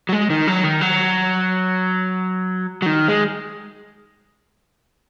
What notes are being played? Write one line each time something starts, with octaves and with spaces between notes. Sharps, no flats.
F#3
G#3
D#3
F#3
D#3
F#3
F#3
D#3
G#3